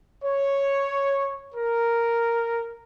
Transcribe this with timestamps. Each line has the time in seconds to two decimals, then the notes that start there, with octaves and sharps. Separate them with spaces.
0.23 C#5
1.55 A#4